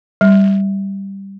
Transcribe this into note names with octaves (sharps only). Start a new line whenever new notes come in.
G3